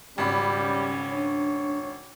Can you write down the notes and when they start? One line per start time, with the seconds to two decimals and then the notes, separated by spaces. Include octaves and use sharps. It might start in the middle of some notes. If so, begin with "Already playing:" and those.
0.18 G#1 C#3 G3 C#4 B5
1.12 D4 C#5